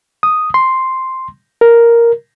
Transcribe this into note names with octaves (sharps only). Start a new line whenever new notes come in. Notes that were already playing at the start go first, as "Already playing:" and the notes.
D#6
C6
A#4